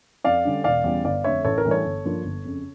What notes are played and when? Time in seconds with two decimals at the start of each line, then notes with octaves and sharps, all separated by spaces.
0.24 F2 D5 F5
0.45 D3 G3 C#4
0.64 E1 D5 F5
0.84 E2 C#3 G3
1.04 G1 D5 F5
1.24 F2 D3 A3 C#5 E5
1.44 A1 A4 C#5
1.58 A#4
1.65 A2 E3 G3 D4
1.71 A4 C#5
1.85 G1
2.05 G2 F3 A#3 D4
2.24 G1
2.44 F2 C#3